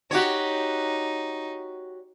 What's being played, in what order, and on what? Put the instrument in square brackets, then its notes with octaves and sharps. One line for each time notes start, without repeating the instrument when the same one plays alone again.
[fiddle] D#4 [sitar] F#4 G4 C#5